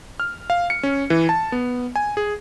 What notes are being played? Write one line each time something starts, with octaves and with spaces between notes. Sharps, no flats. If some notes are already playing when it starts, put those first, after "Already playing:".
F6
F5
C#7
C#4
E3
A5
B3
G#5
G#4